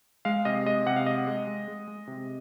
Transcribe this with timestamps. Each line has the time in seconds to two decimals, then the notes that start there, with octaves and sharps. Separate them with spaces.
0.25 G#3 F5
0.45 C3 D#5
0.66 G#3 D#5
0.86 C3 F#5
0.96 F5
1.06 G#3 D#5
1.27 G#3
1.48 G#3
1.68 G#3
1.88 G#3
2.07 C3